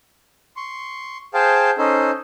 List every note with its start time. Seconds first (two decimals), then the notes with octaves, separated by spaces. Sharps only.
0.56 C6 C#6
1.34 G#4 C5 F5 G5 A5
1.78 C#4 D#4 A4 C5